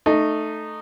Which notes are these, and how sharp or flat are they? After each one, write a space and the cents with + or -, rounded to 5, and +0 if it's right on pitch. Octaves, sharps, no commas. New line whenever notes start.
A3 +0 D#4 -15